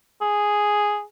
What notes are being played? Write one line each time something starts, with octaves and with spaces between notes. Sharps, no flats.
G#4